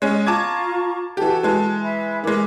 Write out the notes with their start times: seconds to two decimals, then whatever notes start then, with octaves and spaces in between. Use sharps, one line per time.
0.02 G#3 C#4 D#5
0.27 F4 A5 A#5 C#6 D6 G#6
1.17 E3 F#4 G4 A4 A5
1.43 E3 G#3
1.83 E5 B5
2.24 E3 G#3 A#4 B5 D6